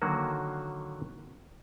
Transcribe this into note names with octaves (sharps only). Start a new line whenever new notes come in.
D3 D#3 F#3 A#3 F#4